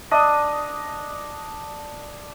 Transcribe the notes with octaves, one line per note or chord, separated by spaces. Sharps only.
D4 D#5 D#6